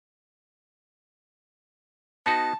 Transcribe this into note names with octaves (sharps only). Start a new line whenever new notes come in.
B3 D#4 F#4 A5